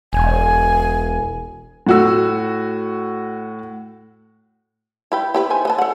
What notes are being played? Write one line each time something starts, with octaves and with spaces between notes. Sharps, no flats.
E1 G#5
A2 F#4 E6
E4 B4 G5
E4 G4 B4
D#3 C5 G#5
E3 D#5 A5
A4 F#5